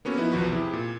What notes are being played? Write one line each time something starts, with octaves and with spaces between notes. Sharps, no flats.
A#3 B3 C#4 F#4 A4
F3 B3 D#4 E4
B1 E2 F3 F#4 B4
C3 E4 G4 G#4
A#2